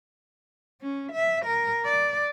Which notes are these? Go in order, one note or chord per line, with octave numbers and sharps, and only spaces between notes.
C#4
E5
A#4
D5